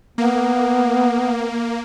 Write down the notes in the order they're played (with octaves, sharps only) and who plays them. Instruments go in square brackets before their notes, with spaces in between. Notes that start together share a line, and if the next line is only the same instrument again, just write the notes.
[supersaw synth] A#3 [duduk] B3